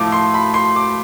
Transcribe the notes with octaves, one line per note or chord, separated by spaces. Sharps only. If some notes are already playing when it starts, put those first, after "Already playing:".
Already playing: A2 F3 A3 D6
C6
B5
C6
D6